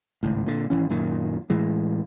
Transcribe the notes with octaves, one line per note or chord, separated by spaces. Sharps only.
G#1 C#2 A2
A#2 D3
G#1 F2 E3 C#4
F#2 A#2 D#3
A2 E3 G#3